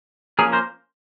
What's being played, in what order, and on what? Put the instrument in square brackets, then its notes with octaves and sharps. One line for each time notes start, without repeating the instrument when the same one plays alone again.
[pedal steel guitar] F3 A#3 C#4 G#4 A#4
A#4 C5